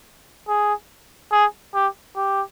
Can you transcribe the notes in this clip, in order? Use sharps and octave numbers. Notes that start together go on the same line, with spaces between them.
G#4
G#4
G4
G4